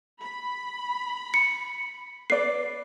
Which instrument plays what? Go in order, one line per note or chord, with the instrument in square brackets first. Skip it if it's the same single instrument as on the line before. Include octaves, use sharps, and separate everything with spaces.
[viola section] B5
[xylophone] C#7
[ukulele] B4 D5 [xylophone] C7